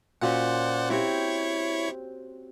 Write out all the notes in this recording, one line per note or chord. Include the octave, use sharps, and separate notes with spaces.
A#2 C#4 F#4 C5 D5 F#5
C4 E4 F#4 G4 C#5 C#6